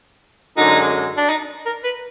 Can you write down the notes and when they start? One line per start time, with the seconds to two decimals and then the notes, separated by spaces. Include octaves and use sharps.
0.57 F#2 D3 G#3 D#4
1.17 D4
1.30 D#4
1.66 A#4
1.84 B4